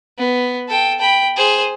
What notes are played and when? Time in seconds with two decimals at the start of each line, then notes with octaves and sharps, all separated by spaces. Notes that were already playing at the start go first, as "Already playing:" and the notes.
0.18 B3
0.69 A4 G5
1.00 G5 B5
1.36 G#4 C5